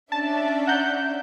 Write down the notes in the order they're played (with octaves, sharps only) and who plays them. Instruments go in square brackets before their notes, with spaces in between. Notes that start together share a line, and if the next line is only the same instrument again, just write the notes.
[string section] C#4 D4 E5 [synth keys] A5
[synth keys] F#5 A#5 G6